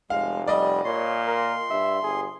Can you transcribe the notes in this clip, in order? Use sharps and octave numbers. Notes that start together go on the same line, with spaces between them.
F1 G#3 F5
G3 D5 D#5
A#2 C#5 C6
A#4
G2 E5
G1 G#4